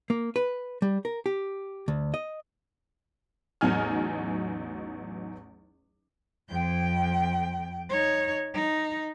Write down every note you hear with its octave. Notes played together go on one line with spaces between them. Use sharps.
A#3
B4
G3
A#4
G4
D2
D#5
A1 E2 F#3 D#4 G#5 F6
F2 G5
D#4 C#5
D#4